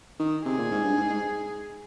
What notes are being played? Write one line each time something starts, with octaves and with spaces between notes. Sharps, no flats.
D#3
C3 G#4
A#2
G#2
G2
G#2
G#2